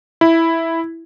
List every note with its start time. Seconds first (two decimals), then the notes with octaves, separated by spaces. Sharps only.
0.21 E4